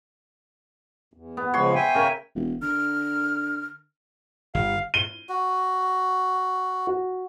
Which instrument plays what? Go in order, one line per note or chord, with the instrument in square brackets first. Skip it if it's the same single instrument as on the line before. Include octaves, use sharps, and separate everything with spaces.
[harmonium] E2
[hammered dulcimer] B3
[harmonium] C#3 F3 G#3 [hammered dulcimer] C#5 B5 C6
[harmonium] E5 G5 G#5
[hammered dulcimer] C#3 A#4 C#5
[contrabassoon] E1
[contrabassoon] D3 [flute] F6
[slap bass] G1 [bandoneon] F5
[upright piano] D#7 G7
[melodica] F#4
[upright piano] F#4